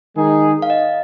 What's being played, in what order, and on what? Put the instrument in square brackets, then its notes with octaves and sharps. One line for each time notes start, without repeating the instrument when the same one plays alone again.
[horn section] D#3 G#3 D#4 G#4
[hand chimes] F5
D#5